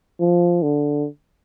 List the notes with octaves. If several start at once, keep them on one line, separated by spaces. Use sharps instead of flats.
F3
D3